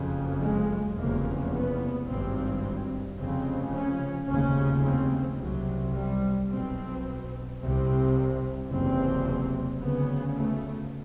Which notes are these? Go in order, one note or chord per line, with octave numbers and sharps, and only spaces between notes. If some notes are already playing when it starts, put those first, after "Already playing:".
Already playing: F#1 F2 C#3
G#3
F1 E2 C#3 A#3
B3
G#1 G2 C4
F1 F2 C#3 C4
C#4
F1 D#2 C#3 C#4
C4
C2 C3 F#3
G3
B1 B2 C4
C2 C3 C4
F#1 E2 C3 C4
D2 C#3 B3
A3